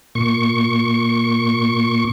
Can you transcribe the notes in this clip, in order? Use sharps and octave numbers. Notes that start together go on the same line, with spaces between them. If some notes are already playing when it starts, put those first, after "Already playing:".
A#2 C#6